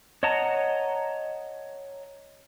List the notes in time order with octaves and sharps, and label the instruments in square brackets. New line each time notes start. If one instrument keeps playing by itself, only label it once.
[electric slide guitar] C#5 D#5 F#5 A5 A#5